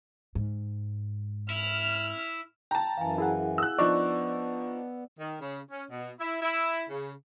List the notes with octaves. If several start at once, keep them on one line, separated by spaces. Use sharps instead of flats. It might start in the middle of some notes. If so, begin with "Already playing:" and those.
G#2
E4 F6
G5 A5 A#5
F#2 E3 F5 G#5
E4 G#4 F#5
E6 F#6
F3 B3 D4 D#4 D5 C#6
D#3
C#3
C#4
B2
E4
E4
C#3